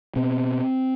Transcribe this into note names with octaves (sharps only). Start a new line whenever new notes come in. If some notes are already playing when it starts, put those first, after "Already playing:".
B2 C4